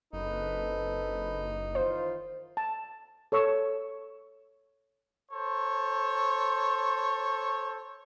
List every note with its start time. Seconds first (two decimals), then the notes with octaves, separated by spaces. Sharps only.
0.13 F#1 C4 D#4 A4 B4
1.75 D#3 E3 F4 C5
2.57 A5
3.32 A4 C#5 C#6 E6
5.32 A4 C5 C#5